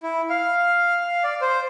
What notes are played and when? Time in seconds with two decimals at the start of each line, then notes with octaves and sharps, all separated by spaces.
0.03 E4
0.30 F5
1.24 D5
1.41 C5